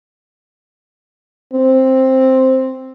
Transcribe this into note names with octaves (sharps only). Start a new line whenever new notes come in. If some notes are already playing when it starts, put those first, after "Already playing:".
C4